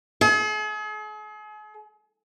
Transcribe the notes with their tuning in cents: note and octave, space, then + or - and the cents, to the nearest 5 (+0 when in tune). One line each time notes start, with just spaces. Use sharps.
G#4 +40